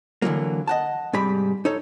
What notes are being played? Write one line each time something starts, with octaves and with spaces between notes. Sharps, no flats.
D3 E3 F#3 A#3
D#5 F#5 A5
G#2 C3 G3 B5
D#4 A4 C#5